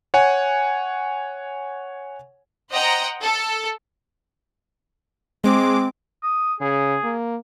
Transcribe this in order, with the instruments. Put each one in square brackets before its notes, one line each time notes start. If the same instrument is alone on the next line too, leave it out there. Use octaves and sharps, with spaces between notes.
[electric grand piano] C#5 F#5 G#5
[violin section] C5 D#5 F#5 G5 A#5
A4
[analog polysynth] G#3 D6 [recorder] C4
[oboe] D#6
[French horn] C#3 [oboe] G#4
[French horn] A#3